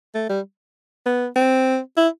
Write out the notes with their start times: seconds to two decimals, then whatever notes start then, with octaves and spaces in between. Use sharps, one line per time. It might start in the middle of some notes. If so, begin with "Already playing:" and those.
0.14 A3
0.29 G3
1.06 B3
1.36 C4
1.97 E4